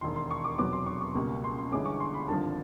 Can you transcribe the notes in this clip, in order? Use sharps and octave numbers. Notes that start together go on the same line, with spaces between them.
E1 D#2 D#3 C6
C6
C#6
D6
F1 E2 B2 F#3 B3 D6
C6
C#6
C#6
C#2 B2 G3 A#3
C6
C6
G1 G2 E3 G#3 C#4 D6
C#6
C6
B5
G#1 G2 D3 F3 A5